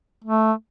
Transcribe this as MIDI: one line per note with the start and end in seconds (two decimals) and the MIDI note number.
0.24 0.52 57